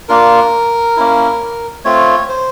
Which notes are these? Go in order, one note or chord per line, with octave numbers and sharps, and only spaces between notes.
A#3 D4 F4 A#4
A#3 C#4 E4
A3 C4 F4 C#5
C5